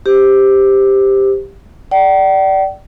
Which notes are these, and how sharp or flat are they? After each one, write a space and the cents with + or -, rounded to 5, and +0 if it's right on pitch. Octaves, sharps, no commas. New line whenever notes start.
G4 +5 C5 -10
D5 +0 G5 -45